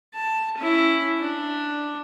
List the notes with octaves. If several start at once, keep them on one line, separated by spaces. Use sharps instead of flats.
A5
C#4 E4
D4